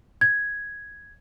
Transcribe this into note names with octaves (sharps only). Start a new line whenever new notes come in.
G#6